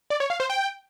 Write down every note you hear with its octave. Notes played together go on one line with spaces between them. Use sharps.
D5
C#5
F5
C5
G5